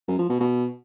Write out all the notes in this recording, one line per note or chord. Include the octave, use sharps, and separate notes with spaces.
F#2
F3
B2
B2